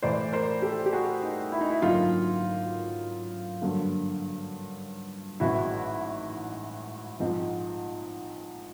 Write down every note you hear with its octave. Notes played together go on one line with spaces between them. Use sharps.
A2 E3 G#3 C5 D5
A#4 C5
G4 A4
G4
F#4 G#4
D#4
E4
D#4
E4
G#1 F#2 D3 F#3 A#3 D#4 F4
G2 D3 F#3 A#3
A1 G#2 D#3 G#3 C4 E4 F#4
A#1 G#2 F3 G#3 C4